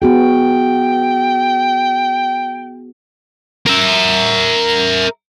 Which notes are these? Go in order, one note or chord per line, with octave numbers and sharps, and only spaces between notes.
B3 F#4 G#4 G5
A#4 E5